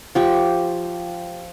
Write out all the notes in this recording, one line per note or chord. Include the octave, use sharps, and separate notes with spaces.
F3 G4 C#6